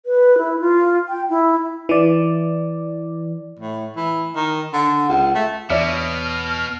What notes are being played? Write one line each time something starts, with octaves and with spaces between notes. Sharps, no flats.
B4
E4
F4
G5
E4
E3 D5
A2
E3
D#3
D3
C#2
A3
E2 B2 C#5 D5 E5 F6